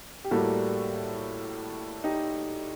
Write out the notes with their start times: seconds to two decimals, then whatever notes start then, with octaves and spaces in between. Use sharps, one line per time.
0.24 G4
0.31 A2 G3 A#3 F#4 A4
2.04 D#4 G4